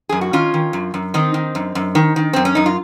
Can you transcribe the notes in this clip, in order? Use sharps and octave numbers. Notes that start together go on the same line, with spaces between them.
F#2 G#4
F#4
D#3 C#4 F4
D#3
F#2
F#2
D#3 C4 D#4
D#3
F#2
F#2
D#3
D#3
F#2 C4
C#4
F#2 D#4
F4